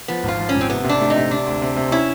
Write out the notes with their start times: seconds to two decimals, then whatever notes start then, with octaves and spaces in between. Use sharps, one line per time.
0.08 F3 B3
0.23 G#1
0.28 F4
0.39 F3
0.49 C#4
0.54 G#1
0.61 C4
0.70 C3 B3
0.84 C3
0.89 D4
1.01 A3
1.10 D#4
1.16 C3
1.31 C3 D4
1.46 D2
1.62 C3
1.76 C3
1.92 C#4 E4